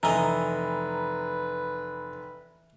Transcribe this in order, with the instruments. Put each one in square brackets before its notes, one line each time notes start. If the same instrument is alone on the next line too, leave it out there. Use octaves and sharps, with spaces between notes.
[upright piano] F1 [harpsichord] E3 D#5 [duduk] B4 [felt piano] A#5